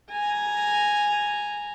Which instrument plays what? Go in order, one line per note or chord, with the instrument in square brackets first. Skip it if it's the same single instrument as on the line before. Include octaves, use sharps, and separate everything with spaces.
[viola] G#5 A#5